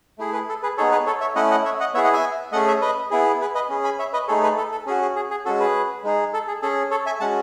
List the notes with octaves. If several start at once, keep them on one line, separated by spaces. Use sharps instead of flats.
A3 E4 G#4
G#4 B4
A4
G#4 B4
B3 D#4 G#4 A4 C#5
G#4 B4
A4 C#5
C#5 E5
A3 C#4 E4 D#5 F#5
D#5 F#5
C#5 E5
D#5 F#5
B3 E4 G#4 C#5 E5
D#5 F#5
E5 G#5
A3 C#4 G#4 D#5 F#5
C#5 E5
B4 D#5
B3 E4 G#4
G#4 B4
B4 D#5
C#4 G#4
G#5 B5
C#5 E5
B4 D#5
A3 D#4 G#4 A4 C#5
G#4 B4
A4
A4
C#4 F#4 G#4
G#4
G#4
G#4
G#3 C#4 F#4 A4
G#4 B4
G#3 D#4 G#4
A4
G#4
C#4 G#4 A4
A4 C#5
E5 G#5
G#3 C#4 F#4 F#5 A5